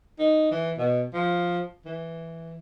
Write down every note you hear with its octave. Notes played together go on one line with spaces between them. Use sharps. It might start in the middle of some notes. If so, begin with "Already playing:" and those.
D#4
E3
B2
F3
E3